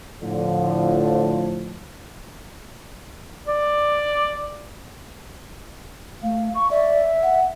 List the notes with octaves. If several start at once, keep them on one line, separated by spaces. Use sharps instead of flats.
A2 D3 F3
D5
A3 F5
C#6
D5 E5
F#5